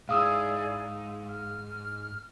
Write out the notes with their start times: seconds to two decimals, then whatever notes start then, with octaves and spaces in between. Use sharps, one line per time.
0.09 G#2 E4 G#4 D5 F5 D#6 E6
1.28 F6